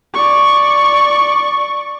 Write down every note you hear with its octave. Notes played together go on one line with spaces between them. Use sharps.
D5 C#6